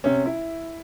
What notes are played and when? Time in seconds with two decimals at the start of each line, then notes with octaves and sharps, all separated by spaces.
0.04 C3 C#4
0.26 E4